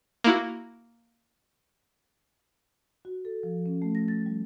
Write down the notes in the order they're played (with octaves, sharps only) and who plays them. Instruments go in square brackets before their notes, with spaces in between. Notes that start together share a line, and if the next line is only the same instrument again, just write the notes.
[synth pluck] A#3 E4 F#4
[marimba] F#4
A4
F3
C#4
A3
A#6
A6
G3